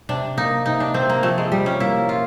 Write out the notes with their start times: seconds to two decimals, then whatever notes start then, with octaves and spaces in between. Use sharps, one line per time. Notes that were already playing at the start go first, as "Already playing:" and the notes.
0.09 C3 D4
0.38 A#3 D#4
0.66 C3 D#4
0.80 D4
0.94 C3 C4
1.09 A#3
1.23 F3 A3
1.38 G#3
1.52 C3 G3
1.66 C#4
1.80 A#3 E4
2.09 A#3 F4